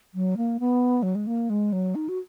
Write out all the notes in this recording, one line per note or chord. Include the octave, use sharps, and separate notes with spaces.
F#3
A#3
B3
F#3
G#3
A#3
G#3
F#3
D#4
F#4